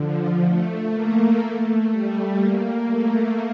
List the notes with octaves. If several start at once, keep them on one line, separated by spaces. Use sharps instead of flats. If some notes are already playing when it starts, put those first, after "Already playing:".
Already playing: D3 F3
A3
A#3
A3
G3
A#3
A3